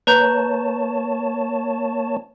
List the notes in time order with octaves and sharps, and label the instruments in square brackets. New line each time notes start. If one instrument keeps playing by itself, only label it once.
[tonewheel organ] A#3 C#5 A5 [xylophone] B4 A#5 G6